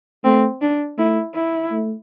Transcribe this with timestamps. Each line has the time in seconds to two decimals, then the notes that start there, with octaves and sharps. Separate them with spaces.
0.24 A3 C4
0.61 D4
0.98 A3 E4
1.35 E4
1.71 A3